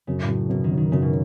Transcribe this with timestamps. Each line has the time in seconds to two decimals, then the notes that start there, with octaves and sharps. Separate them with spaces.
0.07 F#2 C#3
0.22 A2
0.28 F#2
0.49 F#2 B2
0.64 D#3
0.71 F#3
0.77 D#3
0.92 F#2 C#3
1.02 B2